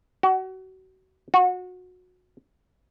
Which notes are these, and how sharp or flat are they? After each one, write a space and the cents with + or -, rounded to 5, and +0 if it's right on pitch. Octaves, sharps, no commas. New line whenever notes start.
F#4 +30
F#4 -25